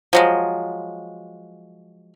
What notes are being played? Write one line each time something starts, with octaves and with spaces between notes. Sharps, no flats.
F3 F#3 G#3